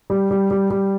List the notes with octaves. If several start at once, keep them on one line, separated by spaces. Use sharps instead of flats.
G3
G3
G3
G3